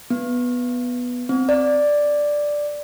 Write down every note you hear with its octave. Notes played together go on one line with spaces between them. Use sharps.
B3
C4
D5